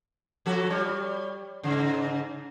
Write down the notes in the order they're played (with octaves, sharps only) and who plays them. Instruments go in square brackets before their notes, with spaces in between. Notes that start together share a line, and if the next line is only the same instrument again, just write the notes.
[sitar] F3 F#4 A4
G3 C#5
G#2 C#3